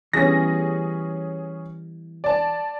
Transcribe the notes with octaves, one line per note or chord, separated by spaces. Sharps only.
E3 G3 B3 C#4 G#4 A#6
D5 A5